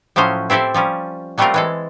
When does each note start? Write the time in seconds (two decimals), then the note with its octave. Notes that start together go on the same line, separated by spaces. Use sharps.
0.16 A2 F3 F#3 C#4 C5
0.50 C4 E4 G4 A4 C5
0.74 F3 G3 C#4
1.38 F#3 G3 A3 C4 F4 A#4
1.54 E3 G#3 A4